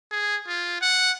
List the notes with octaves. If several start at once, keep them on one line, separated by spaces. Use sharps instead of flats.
G#4
F4
F#5